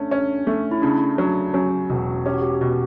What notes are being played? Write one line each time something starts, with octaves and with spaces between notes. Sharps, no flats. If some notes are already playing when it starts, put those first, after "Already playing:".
Already playing: A3 C#4 D4
C#4
A3
E4
C#3 D4
F#3 D4
F#3 C#4
C#4
E1 F#4
C#4 G4
F#4
G4
G4
B2 F#4